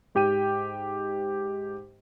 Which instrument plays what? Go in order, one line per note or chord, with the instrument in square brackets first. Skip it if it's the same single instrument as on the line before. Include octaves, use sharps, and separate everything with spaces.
[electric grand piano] G#2 G4 G5 D#7